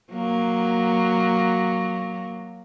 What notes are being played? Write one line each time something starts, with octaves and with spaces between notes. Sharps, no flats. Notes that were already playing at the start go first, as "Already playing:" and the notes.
F#3 A#3